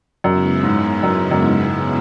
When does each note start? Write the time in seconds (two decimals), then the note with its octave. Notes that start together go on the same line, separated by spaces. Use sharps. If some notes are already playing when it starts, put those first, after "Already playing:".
0.24 F#2 C#3 G#3 B3 E4
0.63 G#2
1.03 F#2
1.31 F#2
1.42 G#2